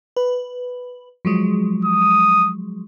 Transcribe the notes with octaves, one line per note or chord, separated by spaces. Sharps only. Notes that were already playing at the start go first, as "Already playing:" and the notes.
B4
F3 F#3 G#3
D#6